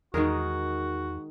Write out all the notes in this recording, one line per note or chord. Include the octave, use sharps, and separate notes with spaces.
E2 D#3 G#3 D#4 F#4 G#4 A#4